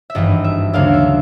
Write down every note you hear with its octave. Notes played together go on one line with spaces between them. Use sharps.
E5
G#1 G2 E3 D#5
E5
D2 C#3 F#3 A#3 D4 F5
E5